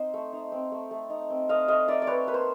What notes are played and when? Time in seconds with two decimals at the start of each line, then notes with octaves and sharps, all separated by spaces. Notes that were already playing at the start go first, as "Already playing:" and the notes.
Already playing: C4 D#4 C5
0.14 A3
0.33 D#4
0.52 C4
0.72 A3
0.91 A3
1.10 D#4
1.30 C4
1.49 A3 D#5 F5
1.68 A3 D#5 F5
1.88 D#4 D5 E5
2.02 D5
2.07 C4 B4 C#5
2.27 A#3 B4
2.34 C5